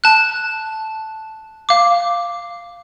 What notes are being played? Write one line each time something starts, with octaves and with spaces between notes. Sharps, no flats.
A5 F#6
F5 D6